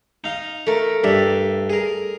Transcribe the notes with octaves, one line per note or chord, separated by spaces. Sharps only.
D#4 F5
A3 A#4
G2 D5 E5
G#4 A#4